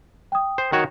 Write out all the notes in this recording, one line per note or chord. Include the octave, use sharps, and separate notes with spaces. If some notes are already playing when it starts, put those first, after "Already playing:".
G5 D#6
C5
D#3 F#4 C#5